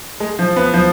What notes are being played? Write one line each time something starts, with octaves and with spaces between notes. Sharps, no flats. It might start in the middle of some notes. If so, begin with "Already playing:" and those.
G#3
F3
B3
F3